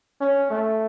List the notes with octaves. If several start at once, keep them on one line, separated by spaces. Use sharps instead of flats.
C#4
A3